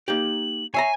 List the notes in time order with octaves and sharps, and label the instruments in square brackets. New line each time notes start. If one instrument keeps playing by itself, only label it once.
[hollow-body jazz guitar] A#3 D#4 G4 [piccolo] F#7
[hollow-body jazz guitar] C#5 E5 A#5 [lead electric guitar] G#5 [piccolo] C7